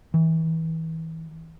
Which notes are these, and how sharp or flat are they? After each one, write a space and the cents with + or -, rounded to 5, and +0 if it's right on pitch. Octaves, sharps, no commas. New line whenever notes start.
E3 -30